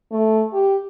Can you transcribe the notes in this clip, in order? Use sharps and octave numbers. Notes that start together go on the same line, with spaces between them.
A3
G4